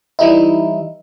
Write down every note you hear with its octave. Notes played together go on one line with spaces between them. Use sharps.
E3 G3 D#4 E4